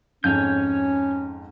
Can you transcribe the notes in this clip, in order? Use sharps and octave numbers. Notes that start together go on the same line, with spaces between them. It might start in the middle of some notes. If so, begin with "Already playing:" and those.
F2 G#2 C#4 C#5 G#5 G6